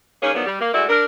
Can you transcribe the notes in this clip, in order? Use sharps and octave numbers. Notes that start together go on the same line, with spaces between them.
D#3 A#3 C#4 G#4 C#5
D#3 F3 F#3 B3 D4
G3
A#3
G#3 A3 E4 F#4 D5
D4 A#4